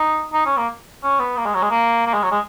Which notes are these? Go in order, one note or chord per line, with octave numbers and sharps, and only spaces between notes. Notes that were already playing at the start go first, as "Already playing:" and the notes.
Already playing: D#4
D#4
C#4
A#3
C#4
B3
A#3
G#3
F#3
G#3
A#3
A#3
G#3
F#3
G#3